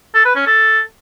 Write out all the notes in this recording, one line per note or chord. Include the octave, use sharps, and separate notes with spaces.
A4
B4
C#4
A4